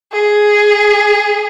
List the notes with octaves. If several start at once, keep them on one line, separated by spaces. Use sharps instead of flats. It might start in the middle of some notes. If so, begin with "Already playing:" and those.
G#4